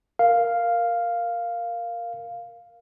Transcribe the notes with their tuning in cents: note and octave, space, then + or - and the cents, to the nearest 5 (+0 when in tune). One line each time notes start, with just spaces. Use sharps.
A#4 +0 F5 +0